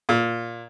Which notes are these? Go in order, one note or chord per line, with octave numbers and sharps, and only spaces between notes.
A#2